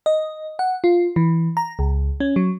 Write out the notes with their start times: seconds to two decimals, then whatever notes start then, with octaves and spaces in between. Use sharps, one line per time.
0.06 D#5
0.59 F#5
0.84 F4
1.16 E3
1.57 A#5
1.79 C#2
2.20 C#4
2.36 F#3